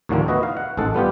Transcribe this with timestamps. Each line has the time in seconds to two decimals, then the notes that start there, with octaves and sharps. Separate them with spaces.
0.09 D#2 A2 D3 F3 A#3 C4
0.28 B3 E4 F#4 B4 D#5
0.43 F5
0.57 F#5
0.77 A1 G#2 G#3 A4 F#5
0.94 G3 B3 F4 G4